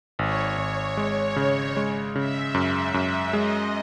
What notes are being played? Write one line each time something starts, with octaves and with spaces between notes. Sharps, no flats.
G#1 C#5
G#1
G#3
C#3
G#3
C#3 E5
F#2
F#2
G#3 D#5